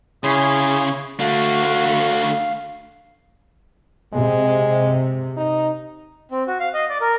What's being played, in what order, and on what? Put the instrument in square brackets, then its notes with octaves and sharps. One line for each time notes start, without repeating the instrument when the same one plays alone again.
[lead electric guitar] C#3 [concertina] E4 C#5 C6 [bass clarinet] G#4
[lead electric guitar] D3 A3 [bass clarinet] F#4 [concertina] F5
[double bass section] C3 [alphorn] G#3
[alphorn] D#4
[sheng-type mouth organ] C4
F#4
F5
D#5
D5
A#4